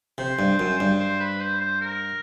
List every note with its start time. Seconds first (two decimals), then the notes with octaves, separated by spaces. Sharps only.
0.18 C3 C5
0.39 G2
0.59 F#2
0.80 G2
1.00 C5
1.20 B4
1.41 C5
1.61 C5
1.81 A#4